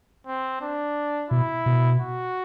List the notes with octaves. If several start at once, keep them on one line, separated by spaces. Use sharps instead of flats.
C4
D4
B2 E4
B2
F#4